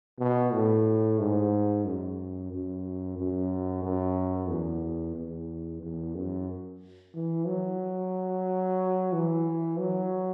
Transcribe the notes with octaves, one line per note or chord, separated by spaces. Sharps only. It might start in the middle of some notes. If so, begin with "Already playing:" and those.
B2
A2
G#2
F#2
F#2
F#2
F#2
E2
E2
E2
F#2
E3
F#3
E3
F#3